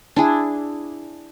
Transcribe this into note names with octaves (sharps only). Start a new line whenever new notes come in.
D4 E4 G#4